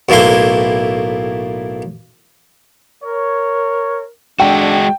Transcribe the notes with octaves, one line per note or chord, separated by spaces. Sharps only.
B1 A2 A#3 E4 C6
A#4 C#5
G#3 D4 F#4 A4 D5 G5